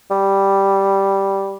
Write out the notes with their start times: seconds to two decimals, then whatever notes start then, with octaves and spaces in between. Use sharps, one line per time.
0.11 G3